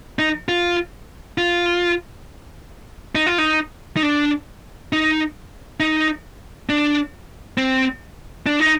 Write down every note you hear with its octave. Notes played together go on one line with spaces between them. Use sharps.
D#4
F4
F4
D#4
F4
D#4
D#4
D4
D#4
D#4
D4
C4
D4
D#4